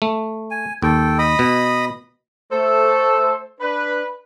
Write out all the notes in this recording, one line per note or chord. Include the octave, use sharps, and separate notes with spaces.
A3
G#5
D#2 A4 G5
D#5 B5 D#6
B2
A3 A4 C5
D4 B4